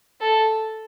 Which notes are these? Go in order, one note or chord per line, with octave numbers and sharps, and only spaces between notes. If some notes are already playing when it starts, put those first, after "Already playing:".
A4